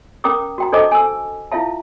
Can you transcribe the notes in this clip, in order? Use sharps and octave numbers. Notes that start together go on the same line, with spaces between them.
C#4 A#4 G5 A#5 D6 D#6
F#4 G5 A#5
D4 A4 C5 D#5 A5 D6
G#5 E6
E4 F4 E5 F5 A5